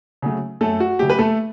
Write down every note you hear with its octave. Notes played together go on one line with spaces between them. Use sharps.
C#3 F#3 A3
F#2 A3 A4
F#4
C#3 F#3 A3 G4
B4
A3 A4